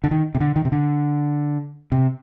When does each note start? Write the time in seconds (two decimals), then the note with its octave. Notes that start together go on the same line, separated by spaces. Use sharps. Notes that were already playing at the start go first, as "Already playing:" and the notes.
0.04 D3
0.11 D#3
0.35 C3
0.41 D3
0.56 D#3
0.65 C3
0.72 D3
1.92 C3